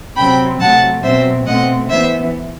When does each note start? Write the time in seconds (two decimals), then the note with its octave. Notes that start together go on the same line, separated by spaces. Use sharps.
0.17 C3 F#3 C4 G5 B5
0.60 C3 F#3 A3 F#5 A5
1.03 B2 F#3 C4 C5 E5
1.46 B2 A3 C4 D#5 F#5
1.90 E3 B3 C5 E5